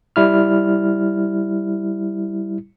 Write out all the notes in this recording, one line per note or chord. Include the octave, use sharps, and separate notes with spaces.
G3 E4 F6